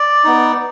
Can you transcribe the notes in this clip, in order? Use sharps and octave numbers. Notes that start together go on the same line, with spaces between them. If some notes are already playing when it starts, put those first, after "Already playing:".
Already playing: D5
B3 D#4